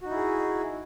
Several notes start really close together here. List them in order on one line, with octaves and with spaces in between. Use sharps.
F#4 D#4 E4 G#4